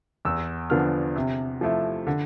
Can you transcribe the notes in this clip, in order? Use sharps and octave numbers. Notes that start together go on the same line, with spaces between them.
E2 E6
D3 F3 B3 D4 F6
C3
F3 A3 E4
D3